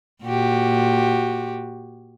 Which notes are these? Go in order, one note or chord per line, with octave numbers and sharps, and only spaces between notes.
A#2 F#4 G4